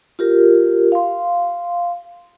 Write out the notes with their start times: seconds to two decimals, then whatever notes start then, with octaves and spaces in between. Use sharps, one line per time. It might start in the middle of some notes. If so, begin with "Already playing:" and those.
0.19 F4 G4 A#4
0.92 F5 C6